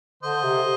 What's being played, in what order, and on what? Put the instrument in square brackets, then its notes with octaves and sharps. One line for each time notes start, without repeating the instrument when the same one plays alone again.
[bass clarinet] D3 [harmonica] C5 D#5
[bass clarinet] C3